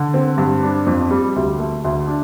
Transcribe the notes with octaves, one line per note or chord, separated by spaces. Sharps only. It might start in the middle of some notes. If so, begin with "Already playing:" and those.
Already playing: D3
C4
G2
D4
F2
G3
D2
A3
D2
D4